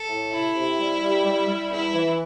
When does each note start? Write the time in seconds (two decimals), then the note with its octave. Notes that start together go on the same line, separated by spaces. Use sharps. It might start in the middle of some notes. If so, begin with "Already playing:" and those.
Already playing: A4
0.08 A2
0.32 C3 E4
0.55 C3
0.78 G3
1.02 G3
1.25 G3
1.47 G3
1.71 E2 E4
1.94 E3